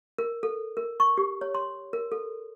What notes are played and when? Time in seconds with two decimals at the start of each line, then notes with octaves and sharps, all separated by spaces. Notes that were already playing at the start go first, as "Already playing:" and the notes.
0.18 A#4
0.43 A4
0.77 A#4
1.00 C#6
1.18 G4
1.41 C#5
1.55 C6
1.93 A#4
2.12 A4